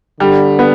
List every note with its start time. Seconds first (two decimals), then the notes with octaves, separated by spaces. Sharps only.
0.20 D3 G3
0.59 B3